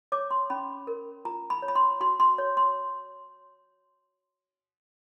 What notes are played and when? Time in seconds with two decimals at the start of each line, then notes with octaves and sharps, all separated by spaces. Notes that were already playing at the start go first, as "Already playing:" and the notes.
0.12 C#5 D6
0.31 C6
0.50 C#4 B5
0.87 A#4
1.25 F4 A#5
1.50 B5
1.62 C#5
1.68 B5
1.75 C6
2.01 F#4 C6
2.20 C6
2.38 C#5
2.57 C6